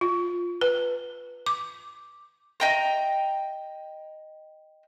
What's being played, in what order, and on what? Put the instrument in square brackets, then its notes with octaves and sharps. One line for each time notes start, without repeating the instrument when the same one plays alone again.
[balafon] F4
B4
D6
[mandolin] D#5 G5 A#5